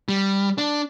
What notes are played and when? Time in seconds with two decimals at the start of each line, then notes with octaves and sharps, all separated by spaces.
0.09 G3
0.58 D4